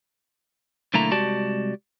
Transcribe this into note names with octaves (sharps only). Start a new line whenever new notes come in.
B1 D3 A3 A#3 E4 A#5
C2 G#3 F#4 G4 D5 A5